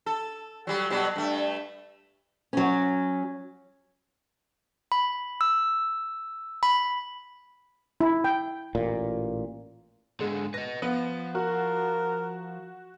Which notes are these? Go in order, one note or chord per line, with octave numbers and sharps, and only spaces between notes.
A4
F#3 G3
B2 F#3 G3
G2 A3
F#3 C#4
B5
E6
B5
E4
G5
A1 A#2
G#2 D3 G#3
B4 D#5 A#6
F3 B3
F#4 A#4